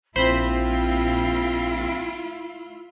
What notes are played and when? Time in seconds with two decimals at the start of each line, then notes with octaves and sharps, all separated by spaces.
0.16 A#1 C4 E4 F4 C5 B5 C6